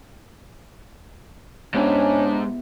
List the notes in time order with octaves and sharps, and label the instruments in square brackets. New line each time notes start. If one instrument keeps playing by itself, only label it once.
[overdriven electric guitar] G#2 [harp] B3 E4 G4 [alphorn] C#4 [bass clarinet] D4